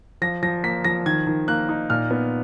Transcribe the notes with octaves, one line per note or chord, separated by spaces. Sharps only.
F3 A#6
F3 A#6
A#3 B6
F3 A#6
D#3 G#6
D#3
A#3 F#6
D#4
A#2 F6
B3